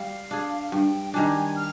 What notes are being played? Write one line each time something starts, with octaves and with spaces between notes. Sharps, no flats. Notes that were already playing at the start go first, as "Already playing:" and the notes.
Already playing: G3 F5
D4 G#4
F5
G2 G5
D#3 G3 D4 G#5
F6